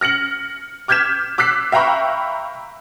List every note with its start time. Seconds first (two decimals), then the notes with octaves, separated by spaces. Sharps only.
0.01 F6 A#6 C#7 F#7
0.88 D6 F6 G6 G#6 B6 E7
1.38 D6 E6 F#6 B6 C7
1.72 E5 F5 G5 A#5 B5 C#6